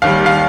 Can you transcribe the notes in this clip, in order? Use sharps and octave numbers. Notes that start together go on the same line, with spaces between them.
D#2 D#3 G3 F5
F5